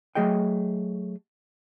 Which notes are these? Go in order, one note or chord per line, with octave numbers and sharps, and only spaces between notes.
F#3 A3 G#4 D#5 G5